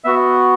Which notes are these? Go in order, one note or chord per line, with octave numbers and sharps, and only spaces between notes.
B3 F#4 E5